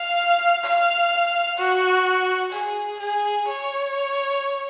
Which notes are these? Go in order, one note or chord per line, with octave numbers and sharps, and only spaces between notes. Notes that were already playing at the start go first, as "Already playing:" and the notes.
Already playing: F5
F5
F#4
G#4
G#4
C#5